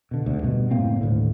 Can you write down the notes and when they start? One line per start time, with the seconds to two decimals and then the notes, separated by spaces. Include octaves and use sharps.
0.11 B2 D3
0.26 D2
0.43 G2 B2
0.71 F#1 A2 A#3 C4
1.01 D#1 D2 A2